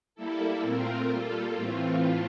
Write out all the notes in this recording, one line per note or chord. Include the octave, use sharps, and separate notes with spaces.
G3 A#3 E4 A4
A#2 A3 C4 F4 A#4
G3 A#3 F4 A4
A2 E3 A3 C4 F4